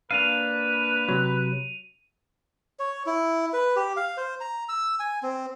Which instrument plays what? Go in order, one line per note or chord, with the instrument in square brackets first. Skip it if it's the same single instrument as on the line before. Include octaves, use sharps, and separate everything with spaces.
[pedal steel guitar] A#3 D4 F5 [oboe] B4 [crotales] D#7 F7
[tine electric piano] C3 F#3
[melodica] C#5
E4
B4
G4
F5
C5
A#5
E6
G#5
C4